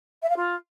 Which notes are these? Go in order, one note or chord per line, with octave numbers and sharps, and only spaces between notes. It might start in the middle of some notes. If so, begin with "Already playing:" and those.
E5
F5
F4